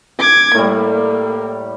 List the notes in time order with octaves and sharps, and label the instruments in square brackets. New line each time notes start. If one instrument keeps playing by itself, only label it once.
[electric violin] D6 G#6
[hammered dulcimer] A2 G3 [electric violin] A#3